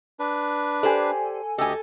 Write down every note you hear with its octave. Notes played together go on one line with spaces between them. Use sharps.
D4 B4
G4 A4 C5 D5 G#5
D2 G4 A4 D#5 G#5